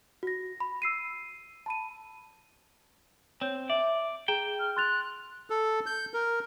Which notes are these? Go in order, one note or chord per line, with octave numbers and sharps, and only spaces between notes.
F#4 A#6
B5
E6 C7 D#7
A5 B5 D#7
C4 C#5 G6
D5 E5
G#4 G5 A#5 E7
F6
C6 F#6 A6 F7
A4
G6
A#4